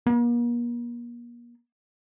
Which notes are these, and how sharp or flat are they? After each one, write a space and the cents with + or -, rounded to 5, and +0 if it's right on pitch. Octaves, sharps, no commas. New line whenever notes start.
A#3 +40